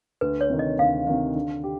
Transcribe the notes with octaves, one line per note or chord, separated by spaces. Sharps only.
D2 B4
C#5
C3 D#3
D#5
D2 F5
C3 D#3
D3
G4